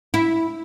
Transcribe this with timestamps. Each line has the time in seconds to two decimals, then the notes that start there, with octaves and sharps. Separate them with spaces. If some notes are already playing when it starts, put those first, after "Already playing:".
0.14 E4